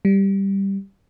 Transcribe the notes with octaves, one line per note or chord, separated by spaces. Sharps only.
G3